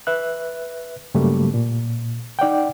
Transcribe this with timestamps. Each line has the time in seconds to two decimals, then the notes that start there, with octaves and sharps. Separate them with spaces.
0.07 B4 E5 F#6
1.14 G2 C#3 F#3 G3 A3 A#3
1.54 A#2
2.39 D#4 D5 F#5 G5